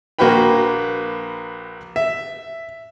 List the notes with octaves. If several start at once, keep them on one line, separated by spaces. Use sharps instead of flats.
A#1 A#3 F#4 B4 G5 B5
E5